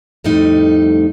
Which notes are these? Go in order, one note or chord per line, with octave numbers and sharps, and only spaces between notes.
F2 A2 G3 A3 D#4